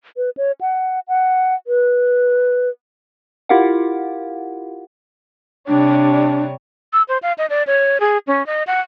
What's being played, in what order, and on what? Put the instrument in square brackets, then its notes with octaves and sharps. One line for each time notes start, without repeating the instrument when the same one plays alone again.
[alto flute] B4
C#5
F#5
F#5
B4
[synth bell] E4 F4 G4 A#4 F5 F#5
[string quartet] C3 G3 C#5 [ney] D4
[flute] E6
C5
F5
D#5
D5
C#5
G#4
C#4
D#5
F#5